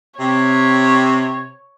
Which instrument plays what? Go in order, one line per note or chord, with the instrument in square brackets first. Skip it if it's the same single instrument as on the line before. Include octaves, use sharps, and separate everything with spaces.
[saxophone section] C3 [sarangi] C#5